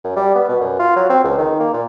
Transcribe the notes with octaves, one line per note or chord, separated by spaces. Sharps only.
F#2
G3
B3
B2
F#2
F4
F#3
C4
C#2
D#3
A#3
A#2